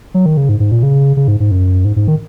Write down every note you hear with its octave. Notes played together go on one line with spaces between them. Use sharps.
F#3
D#3
C#3
G#2
G#2
A#2
C#3
C#3
G#2
G#2
F#2
G#2
G#2
D#3